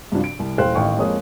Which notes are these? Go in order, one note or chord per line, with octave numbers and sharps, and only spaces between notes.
G2 C3 F3 D4 F#4
D7
C2
D#1 E3 C5 F5 G5 F#6
A1 D#3 F5 G5 C#6
F2 G#3 A#3 C#5 D#6